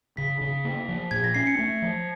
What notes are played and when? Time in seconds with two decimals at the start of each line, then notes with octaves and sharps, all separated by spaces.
0.17 C#3 B6
0.41 C#3
0.64 A#3
0.88 F3
1.11 A#2 G#6
1.24 A#6
1.34 C#4 C7
1.47 C#7
1.59 A3
1.82 F3